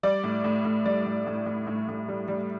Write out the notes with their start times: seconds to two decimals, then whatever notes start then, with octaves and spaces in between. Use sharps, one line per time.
0.03 G3 D5
0.24 A2
0.44 A2
0.65 A2
0.86 G3 D5
1.06 A2
1.27 A2
1.46 A2
1.67 A2
1.88 A2
2.08 G3
2.28 G3